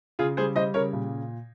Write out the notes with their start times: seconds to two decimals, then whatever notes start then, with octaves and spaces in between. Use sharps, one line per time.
0.19 C#3 F4 G#4
0.37 G3 G#4 C5
0.56 G3 C5 D#5
0.74 C#3 A#4 C#5
0.93 A#2